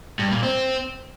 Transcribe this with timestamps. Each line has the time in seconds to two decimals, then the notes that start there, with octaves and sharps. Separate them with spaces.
0.19 G2
0.31 A#2
0.43 C4